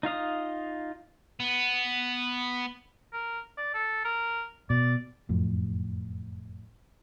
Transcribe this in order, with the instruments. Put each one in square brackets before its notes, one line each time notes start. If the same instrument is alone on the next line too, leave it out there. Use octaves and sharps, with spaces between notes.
[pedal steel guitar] D#4 F4 F5 D#6
[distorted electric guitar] B3
[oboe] A#4
D5
A4
A#4
[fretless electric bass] B2 [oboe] D5
[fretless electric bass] F#1 F2 A2